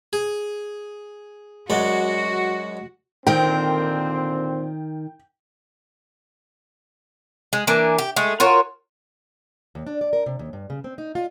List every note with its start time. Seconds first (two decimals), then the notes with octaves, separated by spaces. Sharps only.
0.13 G#4
1.70 F#2 G#3 F#4 D5
3.27 A#2 D3 D#3 C4 A#4 G5
7.53 G#3
7.67 E3 A#3 D4 G#5
7.98 G4
8.16 G#3 A3
8.40 F4 F#4 A#4 C#5
9.75 D#2
9.87 D4
10.01 D5
10.13 A#4
10.26 C3
10.39 D#2
10.53 G2
10.70 C#3
10.84 C4
10.98 D#4
11.15 F4